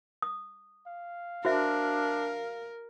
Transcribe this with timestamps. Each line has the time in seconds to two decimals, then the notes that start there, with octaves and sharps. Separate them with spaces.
0.22 D#6
0.87 F5
1.45 D4 F#4 A#4 C5 E5